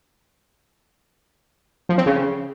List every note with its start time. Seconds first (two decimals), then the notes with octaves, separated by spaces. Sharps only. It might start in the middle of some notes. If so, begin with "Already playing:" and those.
1.89 F3
1.98 C4
2.06 C#3